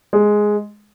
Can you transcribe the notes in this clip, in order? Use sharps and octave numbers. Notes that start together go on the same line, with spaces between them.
G#3